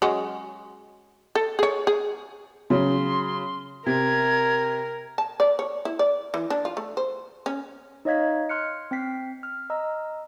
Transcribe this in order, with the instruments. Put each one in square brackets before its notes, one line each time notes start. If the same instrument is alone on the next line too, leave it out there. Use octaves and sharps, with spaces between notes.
[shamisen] F#3 G#3 C#4
A4
G#4 C#5
G#4
[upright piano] C#3 F#3 [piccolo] C6
[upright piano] C3 [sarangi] A#4 [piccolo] G#6
[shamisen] A5
D5
C#5
E4
D5
E3
D4
F4
A3
C5
C#4
[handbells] D#4 C#5 D#5 F5 G#6 B6
D#5
C6 F6 F#6 C#7
C4 G5 B6 C7
F6
D#5 A#5 E6